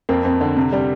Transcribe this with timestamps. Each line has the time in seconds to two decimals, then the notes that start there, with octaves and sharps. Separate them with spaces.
0.09 F2 A#3 C4
0.25 F2
0.41 D3
0.57 C3
0.73 G3